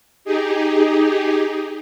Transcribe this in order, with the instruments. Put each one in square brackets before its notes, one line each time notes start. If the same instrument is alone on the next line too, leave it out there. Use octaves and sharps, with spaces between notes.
[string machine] D#4 G4 G#4